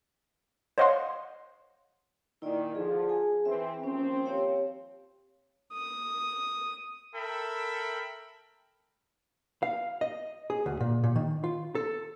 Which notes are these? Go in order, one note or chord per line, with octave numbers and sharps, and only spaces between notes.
C5 C#5 D#5 F5 F#5 C6
A#2 D#3 E4 D5
D3 F3 G#4
G#4 G#5
E3 C4 E5
D#2 F3 C4 C#4
G4 C#5 F5
D#6
A4 A#4 E5 G5 B5
F5
D#5
G#4
D2
A#2
A#2
D#3
F4
A4